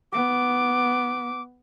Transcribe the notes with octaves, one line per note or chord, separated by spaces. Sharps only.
B3 D6